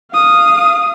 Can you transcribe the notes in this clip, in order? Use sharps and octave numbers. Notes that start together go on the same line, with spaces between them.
F5 D#6